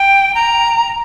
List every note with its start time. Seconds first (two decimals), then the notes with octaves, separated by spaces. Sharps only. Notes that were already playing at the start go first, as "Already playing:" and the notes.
Already playing: G5
0.35 A#5